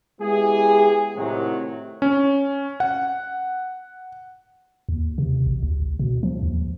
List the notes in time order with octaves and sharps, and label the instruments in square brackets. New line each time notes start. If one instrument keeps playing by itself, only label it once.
[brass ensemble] G#3 B3 E4 G4 G#4
A2 C3 D#3 F#3
[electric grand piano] C#4
F#5
[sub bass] D#2
C3
A1
D2
B2
F3
D#2